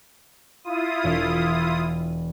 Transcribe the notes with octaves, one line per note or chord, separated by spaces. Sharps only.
E4 F4 D#6
E1 F5